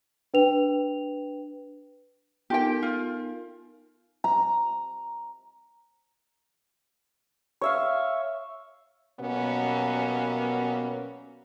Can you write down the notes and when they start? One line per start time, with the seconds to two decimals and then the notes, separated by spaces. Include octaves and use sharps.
0.34 D4 B4 G5 F7
2.50 B3 D#4 G4 A#4 G5
2.83 F4
4.24 A#5
7.61 C#5 E5 F5
9.20 B2 F#3 G3 A#3 B3 C#4